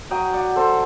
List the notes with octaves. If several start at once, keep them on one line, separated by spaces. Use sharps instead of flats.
F#3 D#5 G5
D5 F#5
C4 A4 C5